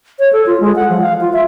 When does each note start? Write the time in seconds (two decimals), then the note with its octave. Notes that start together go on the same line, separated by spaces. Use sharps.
0.19 C#5
0.33 A4
0.46 F4
0.60 G#3
0.76 F#5
0.90 F3
1.02 F5
1.21 F4
1.33 E5